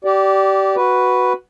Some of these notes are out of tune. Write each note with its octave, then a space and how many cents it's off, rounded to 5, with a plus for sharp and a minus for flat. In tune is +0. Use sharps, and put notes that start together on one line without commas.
G4 -25 D5 -10
F#4 +0 B4 +0